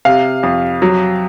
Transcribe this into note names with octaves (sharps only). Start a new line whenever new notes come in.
C3 F5
F2
F#3